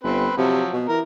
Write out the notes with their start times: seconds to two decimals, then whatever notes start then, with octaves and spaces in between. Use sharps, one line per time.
0.04 G1 C4 B4
0.37 C3 F3 F#3
0.73 B2
0.88 E3 A#4